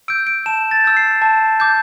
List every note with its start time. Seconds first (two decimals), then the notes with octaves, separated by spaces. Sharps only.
0.08 E6 G6 D7
0.27 D7
0.46 A5 E7
0.71 A6
0.84 E6 G6
0.97 C7
1.22 A5
1.60 D6 G6